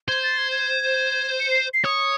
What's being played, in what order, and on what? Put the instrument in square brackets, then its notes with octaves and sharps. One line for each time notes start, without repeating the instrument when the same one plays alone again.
[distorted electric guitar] C5 [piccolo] G#6
[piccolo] A6
G#6
G#6
C#7
C7
C7
[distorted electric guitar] C#5 [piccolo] D#6